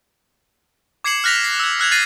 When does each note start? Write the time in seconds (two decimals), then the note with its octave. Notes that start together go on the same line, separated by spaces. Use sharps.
1.04 D6 G#6 C7 C#7 E7 F#7
1.24 F6 F#6 A#6 B6 F7
1.44 C7
1.60 E6 G#6
1.79 E6 F#6 G#6 F7
1.91 F#6 A6 A#6 C7 D#7